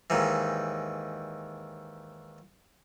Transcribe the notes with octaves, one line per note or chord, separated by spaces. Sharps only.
D#2 G#2 E3